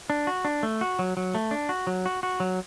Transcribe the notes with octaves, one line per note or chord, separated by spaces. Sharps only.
D4
F#4
D4
A3
F#4
F#3
F#3
A3
D4
F#4
F#3
F#4
F#4
F#3